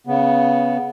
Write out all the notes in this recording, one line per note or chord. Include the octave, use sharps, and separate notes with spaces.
C#3 B3